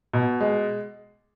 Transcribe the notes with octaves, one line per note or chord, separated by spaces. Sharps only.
B2
G#3